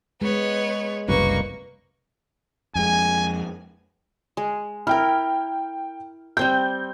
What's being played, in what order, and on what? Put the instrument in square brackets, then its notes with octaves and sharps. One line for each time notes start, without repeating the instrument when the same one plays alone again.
[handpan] G#3 [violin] B3 C#5
[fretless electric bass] F#1 C2 F#2 [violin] A#3 C#6 [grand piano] B4
[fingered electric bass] F2 G#3 [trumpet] G#5
[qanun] G#3
[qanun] E4 A#4 [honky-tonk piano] G5 F6
[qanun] G3 C4 G5 [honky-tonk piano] G6